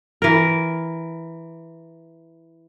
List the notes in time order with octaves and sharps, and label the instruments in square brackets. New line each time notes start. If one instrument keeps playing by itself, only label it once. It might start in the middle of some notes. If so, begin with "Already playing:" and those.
[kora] E3 A#4